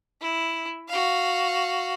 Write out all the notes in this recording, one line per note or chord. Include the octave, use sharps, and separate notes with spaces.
E4
F#4 F5